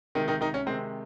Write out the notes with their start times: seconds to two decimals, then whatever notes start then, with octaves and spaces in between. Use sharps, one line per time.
0.15 C3 D#3 G#3 D#4
0.28 D#3 D#4
0.41 D#3 D#4
0.54 C#4
0.66 C3 D#3 G#3 C4